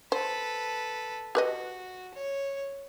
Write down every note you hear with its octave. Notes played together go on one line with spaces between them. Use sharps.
A4 B4 C5
F#4 G4 B4 D#5
C#5